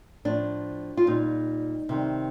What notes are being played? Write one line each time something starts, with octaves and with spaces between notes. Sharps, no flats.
A2 F3 D4
F4
A#2 G3 D#4
C3 D#3 G3